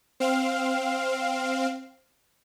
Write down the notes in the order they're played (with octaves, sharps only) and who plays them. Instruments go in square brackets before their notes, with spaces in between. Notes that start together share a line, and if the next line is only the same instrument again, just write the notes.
[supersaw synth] C4 F5